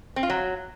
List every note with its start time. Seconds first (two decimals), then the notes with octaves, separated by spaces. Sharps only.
0.16 C4
0.23 F4
0.30 F#3